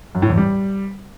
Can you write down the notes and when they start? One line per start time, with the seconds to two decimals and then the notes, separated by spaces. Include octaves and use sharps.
0.15 F#2
0.22 A2
0.30 E2
0.37 G3